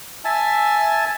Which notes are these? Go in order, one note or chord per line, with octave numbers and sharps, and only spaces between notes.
E5 G#5 A5